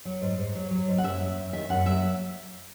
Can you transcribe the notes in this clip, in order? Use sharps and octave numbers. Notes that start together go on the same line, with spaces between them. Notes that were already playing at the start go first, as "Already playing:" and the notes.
F#3
G#2
G#2
F#3
F#3
G#2
F#5
F#2 E5
F#3
F#2
D#3 E5
F#2 F#5
F#3 E5
E5